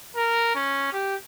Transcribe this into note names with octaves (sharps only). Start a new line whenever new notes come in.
A#4
C#4
G4